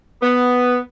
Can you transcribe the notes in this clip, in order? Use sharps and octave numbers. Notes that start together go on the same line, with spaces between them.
B3